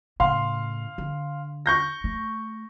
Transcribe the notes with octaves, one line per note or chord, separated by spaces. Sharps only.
A2 C#3 F5 C6
D3
C#6 G6 A#6
A3